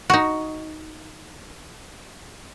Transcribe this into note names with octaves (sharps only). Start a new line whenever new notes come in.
D#4 F#4